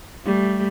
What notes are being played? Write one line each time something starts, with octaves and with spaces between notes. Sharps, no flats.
G3 A3